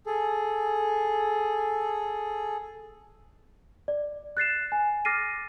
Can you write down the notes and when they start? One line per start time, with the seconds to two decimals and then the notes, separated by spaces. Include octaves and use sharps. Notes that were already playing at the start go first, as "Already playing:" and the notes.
0.06 G#4 A4
3.88 D5
4.37 F#6 A6 C7 E7
4.72 G#5
5.05 D6 F6 A6 A#6 C7 D#7